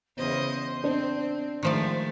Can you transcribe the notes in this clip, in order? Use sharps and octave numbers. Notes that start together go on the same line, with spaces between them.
E2 C#3 C5 D#5
C4 D4
D#3 F3 G#3 A3 C5 D5